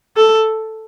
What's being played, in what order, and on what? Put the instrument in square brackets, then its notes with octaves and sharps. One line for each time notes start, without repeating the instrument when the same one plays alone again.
[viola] A4